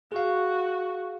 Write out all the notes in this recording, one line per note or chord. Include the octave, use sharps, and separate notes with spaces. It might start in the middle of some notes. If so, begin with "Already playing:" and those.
F#4 G#4 F5